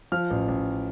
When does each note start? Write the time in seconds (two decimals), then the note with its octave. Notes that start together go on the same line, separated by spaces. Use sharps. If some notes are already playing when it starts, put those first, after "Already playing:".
0.12 F3 F6
0.30 A1
0.48 A1